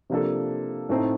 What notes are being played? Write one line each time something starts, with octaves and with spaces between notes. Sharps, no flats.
C3 F3 A#3 D4 A4
A2 A3 C4 D#4